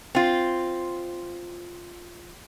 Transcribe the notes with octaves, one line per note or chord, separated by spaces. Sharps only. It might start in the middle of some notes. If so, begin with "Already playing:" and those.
C4 F4